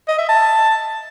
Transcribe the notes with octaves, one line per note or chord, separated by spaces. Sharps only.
D#5
E5
A5